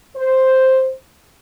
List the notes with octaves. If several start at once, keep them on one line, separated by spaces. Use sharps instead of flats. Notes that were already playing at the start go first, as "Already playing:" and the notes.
C5